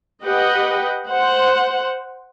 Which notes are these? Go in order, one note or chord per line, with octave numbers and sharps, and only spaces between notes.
G4 B4 D#5 F#5 G5
C5 F#5